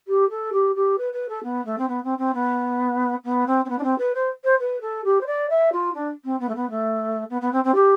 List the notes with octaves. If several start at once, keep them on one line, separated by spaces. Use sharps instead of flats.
G4
A4
G4
G4
B4
B4
A4
B3
A3
C4
B3
C4
C4
B3
B3
C4
C4
B3
D4
C4
B4
C5
C5
B4
A4
G4
C5
D5
E5
F4
D4
C4
B3
A3
B3
A3
B3
B3
C4
C4
G4